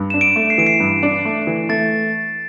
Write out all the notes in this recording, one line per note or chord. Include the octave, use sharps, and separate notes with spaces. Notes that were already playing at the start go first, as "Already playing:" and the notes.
Already playing: G2
D4 E7
D7
A3
C7
E3 D7
C7
G2
D4
A3
E3
A3 A6